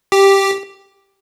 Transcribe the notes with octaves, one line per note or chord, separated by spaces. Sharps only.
G4